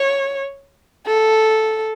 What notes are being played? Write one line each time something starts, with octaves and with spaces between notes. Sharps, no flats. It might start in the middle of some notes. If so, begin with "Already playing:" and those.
Already playing: C#5
A4